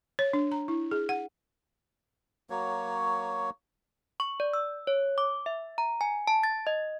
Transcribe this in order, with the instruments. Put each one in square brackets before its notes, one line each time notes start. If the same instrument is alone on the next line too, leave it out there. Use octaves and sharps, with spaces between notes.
[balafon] C#5
D4
A#5
E4
G#4
F#5
[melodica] F#3 A#3 F#4 C#5
[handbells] C#6
D5
E6
C#5
D6
E5
A#5
G#5
A5
A6
D#5